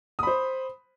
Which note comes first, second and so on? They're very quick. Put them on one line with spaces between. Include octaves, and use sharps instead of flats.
D#6 B5 C5